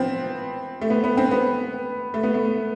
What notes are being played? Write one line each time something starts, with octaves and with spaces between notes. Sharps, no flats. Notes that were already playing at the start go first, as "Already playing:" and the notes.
Already playing: F3 B3 C4
A3
B3
B3
C4
B3
A3
B3
A3